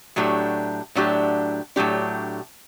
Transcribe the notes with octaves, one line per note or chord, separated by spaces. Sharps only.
A2 F#3 A3 D4 G4
A2 F#3 A3 D4 G4
A2 F#3 A3 D4 G4